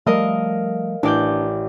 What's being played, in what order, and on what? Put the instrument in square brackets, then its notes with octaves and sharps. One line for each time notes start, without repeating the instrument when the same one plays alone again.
[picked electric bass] F3 G3 A3 [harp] A#4 D#5 F5
[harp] A1 D5 G6 [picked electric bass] D4